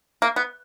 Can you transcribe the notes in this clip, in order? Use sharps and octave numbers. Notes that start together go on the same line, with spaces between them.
A#3
B3